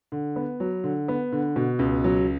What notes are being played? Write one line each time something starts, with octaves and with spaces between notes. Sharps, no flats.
D3
B3
F#3
D3
B3
D3
B2
C#2
F#3